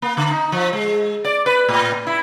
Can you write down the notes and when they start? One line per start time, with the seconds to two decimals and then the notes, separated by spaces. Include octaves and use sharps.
0.02 A#3
0.17 D3
0.31 D#4
0.52 F3
0.73 G#3
1.24 D5
1.46 B4
1.69 A2
2.07 E4